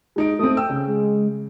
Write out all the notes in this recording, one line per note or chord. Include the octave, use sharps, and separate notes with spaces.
G#3 D#4 D7
A3 C4 D#6
G5 E6
C#3
G#3